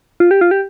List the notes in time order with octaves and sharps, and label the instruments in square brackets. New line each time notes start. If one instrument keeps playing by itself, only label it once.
[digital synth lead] F4
G4
F4
G4